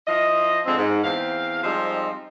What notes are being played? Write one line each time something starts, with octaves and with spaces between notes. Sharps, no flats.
F3 E4 D#5
F2 D3 G#3 C4
G#2
E2 C4 F5
F3 G3 G#3 C4 D#4